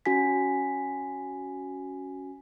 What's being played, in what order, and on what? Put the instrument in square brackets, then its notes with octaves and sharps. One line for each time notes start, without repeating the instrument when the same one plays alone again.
[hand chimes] C#4 F#4 G#5 B6